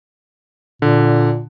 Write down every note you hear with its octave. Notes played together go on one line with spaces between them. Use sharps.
A#2 D3